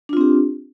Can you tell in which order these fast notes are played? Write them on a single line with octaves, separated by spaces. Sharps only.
D4 F4 C4 G4